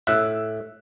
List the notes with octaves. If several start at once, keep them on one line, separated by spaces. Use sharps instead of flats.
A2 E5 E6 F#6